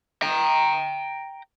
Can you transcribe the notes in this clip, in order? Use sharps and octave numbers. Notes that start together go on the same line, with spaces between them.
G5 A#5